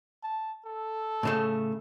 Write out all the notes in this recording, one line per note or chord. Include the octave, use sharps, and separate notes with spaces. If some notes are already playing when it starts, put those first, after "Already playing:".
A5
A4
A2 C#3 A3